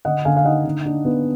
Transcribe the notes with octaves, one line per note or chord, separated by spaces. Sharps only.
D3 D#5 F#5
D3 F5 G#5
F5
D#4 D#5 F#5
D3
D4
B3